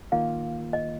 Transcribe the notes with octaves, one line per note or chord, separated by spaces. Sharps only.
D#3 A#3 F4 F5
D#5